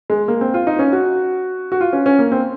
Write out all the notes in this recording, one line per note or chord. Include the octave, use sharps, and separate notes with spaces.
G#3
A#3
C4
F4
D#4
C#4
F#4
F#4
F4
C#4
C#4
A#3
C4